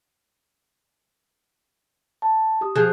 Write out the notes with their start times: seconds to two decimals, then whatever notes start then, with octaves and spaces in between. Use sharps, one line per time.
2.22 A5
2.61 G4 D#6
2.75 F3 G#4 F#6